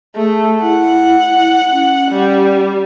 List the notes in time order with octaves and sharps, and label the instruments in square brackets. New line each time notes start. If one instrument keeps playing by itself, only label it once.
[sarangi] A3 [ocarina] G#4
[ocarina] E4 [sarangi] F#5
[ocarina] C#4
[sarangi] G3